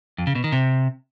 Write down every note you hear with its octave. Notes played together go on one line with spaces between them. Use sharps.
F2
C#3
B2
D#3
C3